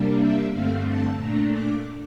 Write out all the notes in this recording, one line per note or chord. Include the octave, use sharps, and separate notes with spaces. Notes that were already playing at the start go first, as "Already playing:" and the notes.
Already playing: C3 G3 A#3 D4
E5
G2 D3 A3 C4 F5
A5
A#2 A3 D4 A#5
D6